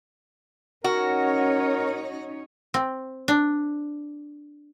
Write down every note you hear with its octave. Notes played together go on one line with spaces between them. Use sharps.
C#4 D#4 F#4 A#4 C#5
C4
D4